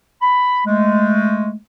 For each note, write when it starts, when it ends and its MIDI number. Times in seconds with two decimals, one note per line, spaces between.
0.22 0.60 83
0.66 1.54 56
0.66 1.54 57